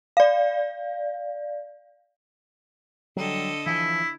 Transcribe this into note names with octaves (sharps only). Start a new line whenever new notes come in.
D5 F5
D3 F#3 G3 A4 D#5
E3 F3 E4